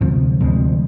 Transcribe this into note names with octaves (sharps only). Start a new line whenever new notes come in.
D2 C3 F3 G#3
D2 C3 F3 G#3